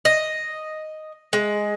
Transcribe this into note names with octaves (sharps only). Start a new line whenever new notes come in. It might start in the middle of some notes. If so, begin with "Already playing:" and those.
D#5
G#3